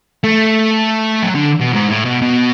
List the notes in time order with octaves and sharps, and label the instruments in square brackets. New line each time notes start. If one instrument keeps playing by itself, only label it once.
[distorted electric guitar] A3
F#3
D3
B2
G#2
A2
B2
B2